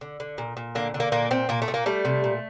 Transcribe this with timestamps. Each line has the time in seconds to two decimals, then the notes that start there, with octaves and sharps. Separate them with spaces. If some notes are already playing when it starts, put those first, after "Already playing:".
0.01 D3
0.20 D3
0.38 A#2
0.57 A#2
0.75 D3 A#3
0.94 D3
1.00 A#3
1.12 A#2 A#3
1.31 A#2 C4
1.49 A#2 A#3
1.62 A3
1.68 A#2
1.74 A#3
1.86 G3 A3
2.05 C3
2.24 A#2